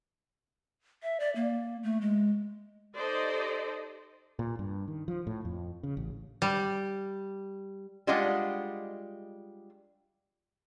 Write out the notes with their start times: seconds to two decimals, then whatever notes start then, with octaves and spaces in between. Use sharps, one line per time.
1.03 E5
1.20 D5
1.36 A#3
1.83 A3
2.01 G#3
2.97 D#4 G4 A4 C5 D5 D#5
4.39 A#2
4.59 G2
4.88 D#3
5.08 F3
5.27 A2
5.45 F2
5.83 C#3
5.97 A1
6.42 G3
8.07 G3 G#3 D4 F4 D#5 F#5